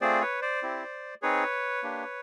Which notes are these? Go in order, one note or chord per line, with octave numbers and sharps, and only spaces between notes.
A3 C4 F4 G#4 C5 D5
B4 C#5
C5 D5
C4 E4 G4
C4 D#4 G#4 B4 C#5
A#3 D4 G4